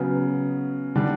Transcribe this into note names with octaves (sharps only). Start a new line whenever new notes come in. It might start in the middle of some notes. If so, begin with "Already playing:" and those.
Already playing: C#3 F#3 B3
D3 G3